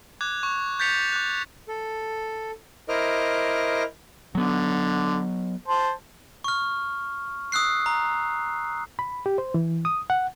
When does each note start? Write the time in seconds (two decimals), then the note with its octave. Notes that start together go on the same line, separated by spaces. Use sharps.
0.21 D6 F#6 G#6
0.43 C#6
0.79 G6 A6 B6 C#7 F7
1.12 D6 F#6
1.68 A4
2.89 E4 A#4 C5 D#5 D6 F6
4.35 D3 F#3 B3
5.68 C5 A5
6.44 C#6 F6
7.52 D#6 E6 F#6 C7
7.86 A#5
8.99 B5
9.26 G4
9.38 C5
9.54 E3
9.85 D#6
10.10 F#5